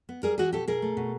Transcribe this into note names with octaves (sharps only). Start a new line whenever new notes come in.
B3
G3 G#4 A#4
E3 F#4 G#4
B2 G4 A4
B2 G#4 A#4
A3
B2